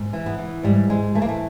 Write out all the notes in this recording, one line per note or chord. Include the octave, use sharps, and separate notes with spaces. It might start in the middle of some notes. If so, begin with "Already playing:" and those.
Already playing: G#2
E3
B3
E3
G#2 G3
G#2 G#3
E3 A3
A#3
A3